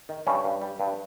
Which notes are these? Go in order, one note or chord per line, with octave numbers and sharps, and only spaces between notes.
D#3
G2 C#4
G2
G3
G2